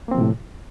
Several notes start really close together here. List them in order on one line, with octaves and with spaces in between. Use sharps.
A#3 C4 F3 C3 A2